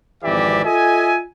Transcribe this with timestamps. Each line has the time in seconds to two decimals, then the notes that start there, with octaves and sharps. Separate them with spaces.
0.24 G#1 F2 E3 G4 D5 E5
0.64 F4 A4 D#5 E5 G#5